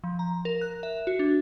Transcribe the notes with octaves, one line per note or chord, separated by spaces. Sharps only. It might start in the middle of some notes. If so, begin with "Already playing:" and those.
F3
A#5
A#4
F#6
E5
F#4
D4